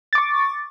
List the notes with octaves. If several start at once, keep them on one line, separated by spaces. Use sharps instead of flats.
C#6 D6 A6